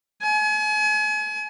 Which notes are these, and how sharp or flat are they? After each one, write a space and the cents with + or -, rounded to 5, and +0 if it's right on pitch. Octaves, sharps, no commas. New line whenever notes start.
G#5 +35